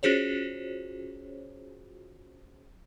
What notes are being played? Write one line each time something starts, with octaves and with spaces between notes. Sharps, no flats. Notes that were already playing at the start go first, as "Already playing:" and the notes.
C#4 F4 F#4 G#4 C5 C#5